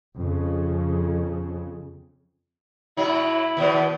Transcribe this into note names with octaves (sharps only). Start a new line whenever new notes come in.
F2 C#3
A2 F#3 E4
D#2 B2 F3